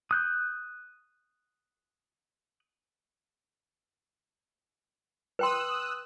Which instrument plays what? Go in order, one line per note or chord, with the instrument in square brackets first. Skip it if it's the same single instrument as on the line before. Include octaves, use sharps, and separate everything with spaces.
[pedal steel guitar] D#6 F#6 G6
[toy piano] B4 G5 C6 [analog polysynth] D#6 E6 F#6